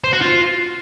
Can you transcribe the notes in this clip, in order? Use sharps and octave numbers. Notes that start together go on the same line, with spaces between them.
C5
F#4
F4